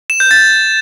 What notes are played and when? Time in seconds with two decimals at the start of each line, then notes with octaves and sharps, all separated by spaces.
0.10 E7
0.20 G6
0.31 A6